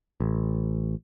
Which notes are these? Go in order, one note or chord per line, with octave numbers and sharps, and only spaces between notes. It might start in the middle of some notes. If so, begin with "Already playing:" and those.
A1